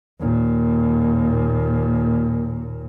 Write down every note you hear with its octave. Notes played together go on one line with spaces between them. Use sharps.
D#2 A#2